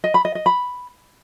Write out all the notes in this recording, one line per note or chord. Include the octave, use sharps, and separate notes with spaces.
D#5
B5
D#5
D#5
B5